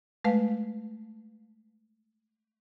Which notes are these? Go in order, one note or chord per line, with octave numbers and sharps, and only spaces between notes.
G#3 A3 B4 F5